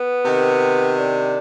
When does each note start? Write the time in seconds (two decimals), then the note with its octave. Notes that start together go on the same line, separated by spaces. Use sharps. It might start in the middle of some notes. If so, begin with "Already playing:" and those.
Already playing: B3
0.25 C3 D#3
0.98 D4